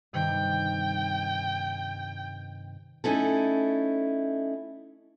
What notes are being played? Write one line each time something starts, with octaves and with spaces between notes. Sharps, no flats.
G2 C3 D#3 G5
A3 C#4 D#4 E4 A4